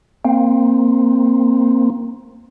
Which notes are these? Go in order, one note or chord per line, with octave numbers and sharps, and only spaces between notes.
A#3 C4